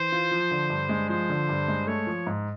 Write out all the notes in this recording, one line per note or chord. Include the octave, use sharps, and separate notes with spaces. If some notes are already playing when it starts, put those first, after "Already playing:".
Already playing: E3 C5
F4
F3
D3
G2
G#3
F3 C5
D3
G2
G#3
A3 C#5
F3
G#2